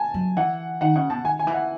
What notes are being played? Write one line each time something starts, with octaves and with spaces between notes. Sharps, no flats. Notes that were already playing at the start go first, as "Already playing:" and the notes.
Already playing: G#5 A5
F#3
E3 F#5
D#3 F#5
C#3 F#5
B2 A5
D#3 G#5
G#5
E3
F#5